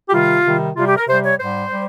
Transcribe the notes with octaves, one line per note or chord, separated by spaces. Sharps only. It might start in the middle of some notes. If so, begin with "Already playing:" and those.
G4
C3 D#3 G3 F4
C3 D#3 G3
C3 G3 F4
G4
A#4
C3 G3 C5
C#5
G#2 G3 C5
G3